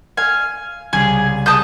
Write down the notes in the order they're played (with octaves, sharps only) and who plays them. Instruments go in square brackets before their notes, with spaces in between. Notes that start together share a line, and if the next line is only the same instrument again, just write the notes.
[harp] F5 F6 [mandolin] G#5
[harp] C2 C#3 [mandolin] G#4
[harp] G#4 G#5 A#6 [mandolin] A5 D#6 G6